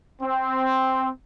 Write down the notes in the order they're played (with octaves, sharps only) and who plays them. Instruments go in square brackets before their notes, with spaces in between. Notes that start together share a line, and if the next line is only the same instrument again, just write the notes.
[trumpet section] C4